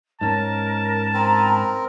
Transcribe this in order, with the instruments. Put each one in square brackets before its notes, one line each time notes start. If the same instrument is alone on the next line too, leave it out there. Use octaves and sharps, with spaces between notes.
[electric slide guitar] G#2 C#4 [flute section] A#4 [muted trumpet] A5
[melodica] C4 A#4 [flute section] G#5 A#5 B5